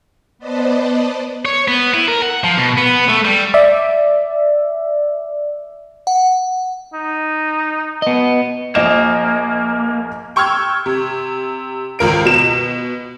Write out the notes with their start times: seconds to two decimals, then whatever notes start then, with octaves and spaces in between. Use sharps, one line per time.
0.39 B3 B4 C5 D5 D#5 A5
1.45 C#5
1.68 B3
1.94 E4
2.08 A#4
2.22 F#5
2.44 F3
2.58 B2
2.77 B3
3.09 A3
3.24 G3
3.54 D5 E5
6.07 F#5
6.93 D#4
8.02 B3 D#5
8.75 A#1 A#3 D#5 E7
10.36 G5 C#6 E6 F6 G#6
10.86 C3
11.99 G#1 C#2 A#4 D7
12.25 B2 E7